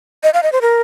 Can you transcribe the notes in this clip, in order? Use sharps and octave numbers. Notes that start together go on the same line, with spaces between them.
D#5
F5
D#5
C5
A#4